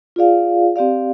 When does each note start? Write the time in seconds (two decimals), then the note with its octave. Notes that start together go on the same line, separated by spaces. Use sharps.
0.16 F4 G#4 D5 F5
0.76 C4 G4 D5 F5